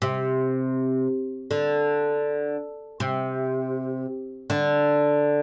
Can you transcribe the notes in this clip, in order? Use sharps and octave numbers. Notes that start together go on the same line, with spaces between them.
C3
D3
C3
D3